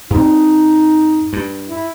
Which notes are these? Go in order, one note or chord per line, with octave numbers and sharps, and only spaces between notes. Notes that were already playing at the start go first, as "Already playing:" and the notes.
G2 C4 D#4
G2
E4